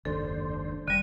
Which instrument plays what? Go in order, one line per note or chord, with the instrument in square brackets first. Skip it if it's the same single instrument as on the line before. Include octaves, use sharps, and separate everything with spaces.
[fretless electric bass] F#1 D#2 G#2 [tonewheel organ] D4 C5 [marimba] A4
[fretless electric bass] F1 [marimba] D3 G3 [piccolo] D#7